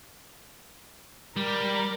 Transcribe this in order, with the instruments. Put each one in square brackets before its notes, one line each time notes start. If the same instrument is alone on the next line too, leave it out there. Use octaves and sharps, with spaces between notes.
[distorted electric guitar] G3 [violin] A#4 D5